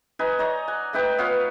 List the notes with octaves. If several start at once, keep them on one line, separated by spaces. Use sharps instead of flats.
D#4 B4 G#5
D#4 C#5 D5 A#5
F#5 G#5
A3 D#4 B4 G5
B3 F4 C#5 F5